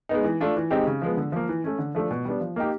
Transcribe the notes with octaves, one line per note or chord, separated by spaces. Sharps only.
G#3 B3 D#4
E3
A3 D4 F4
E3
G#3 C4 D#4 G4
C#3
F3 G#3 B3
D3
F3 A#3
E3
A3 C#4
D3
F3 A3 D4
B2
G3 B3 D4
F3
A#3 D#4 G4